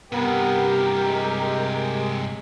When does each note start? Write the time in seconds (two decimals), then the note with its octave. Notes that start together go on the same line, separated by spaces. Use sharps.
0.12 G2 C3 B3 G4 A#4
1.06 G#3